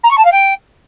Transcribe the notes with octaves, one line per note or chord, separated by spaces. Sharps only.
A#5
C#6
A5
F5
G5